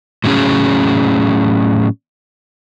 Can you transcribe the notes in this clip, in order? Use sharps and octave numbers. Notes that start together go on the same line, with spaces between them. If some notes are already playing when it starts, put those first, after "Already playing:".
A2 F#3 C#4 G#4